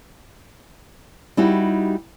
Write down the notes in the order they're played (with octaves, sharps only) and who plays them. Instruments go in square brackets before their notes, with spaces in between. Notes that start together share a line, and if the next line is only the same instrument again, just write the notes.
[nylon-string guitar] G3 D#4 E4 F#4 G4